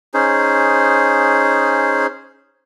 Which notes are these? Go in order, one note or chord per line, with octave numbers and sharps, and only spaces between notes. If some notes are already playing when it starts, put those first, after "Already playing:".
C#4 D#4 G#4 C5